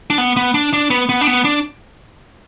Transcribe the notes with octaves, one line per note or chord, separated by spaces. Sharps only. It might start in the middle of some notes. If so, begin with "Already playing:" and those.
D4
B3
B3
D4
D4
B3
B3
D4
B3
D4